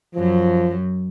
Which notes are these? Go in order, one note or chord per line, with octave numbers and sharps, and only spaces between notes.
F#2 F3 F#3